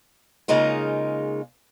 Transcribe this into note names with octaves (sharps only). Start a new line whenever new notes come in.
C#3 G#3 A#3 D#4 F4